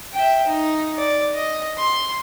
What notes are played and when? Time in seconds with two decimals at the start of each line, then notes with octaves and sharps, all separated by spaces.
0.13 E5 G5
0.46 D#4
0.97 D5
1.34 D#5
1.77 C6